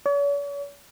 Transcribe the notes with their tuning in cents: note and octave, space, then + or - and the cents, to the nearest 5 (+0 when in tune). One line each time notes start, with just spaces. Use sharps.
C#5 +45